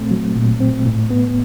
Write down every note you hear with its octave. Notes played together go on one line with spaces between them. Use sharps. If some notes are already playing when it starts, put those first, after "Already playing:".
Already playing: A#2 A3 C4
F#3
A#2
C4
A2
B3